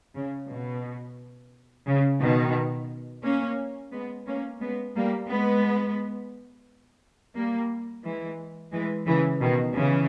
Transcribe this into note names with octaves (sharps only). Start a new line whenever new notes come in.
C#3
B2
C#3
B2 D#3
A#3 C#4
G#3 B3
A#3 C#4
G#3 B3
G3 A#3
G#3 B3
G3 A#3
E3 G#3
E3 G#3
C#3 E3
B2 D#3
C#3 E3